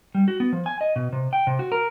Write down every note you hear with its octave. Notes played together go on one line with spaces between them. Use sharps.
G3
F#4
B3
F3
G#5
D#5
B2
C3
G5
C3
F#4
A#4